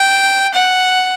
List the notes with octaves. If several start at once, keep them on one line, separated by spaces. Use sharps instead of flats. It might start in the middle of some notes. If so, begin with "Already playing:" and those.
Already playing: G5
F#5